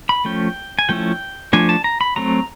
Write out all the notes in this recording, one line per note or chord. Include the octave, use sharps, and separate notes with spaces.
B5
F3 A3 C#4 G5
G#5
F3 A3 C#4 E4 G5
F3 A3 D4 G#5
A5
A#5
B5
F#3 A3 C4 A#5